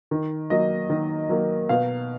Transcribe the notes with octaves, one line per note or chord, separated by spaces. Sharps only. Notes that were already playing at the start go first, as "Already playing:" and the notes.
D#3
F#3 A#3 D#5
D#3
F#3 A#3
B2 F5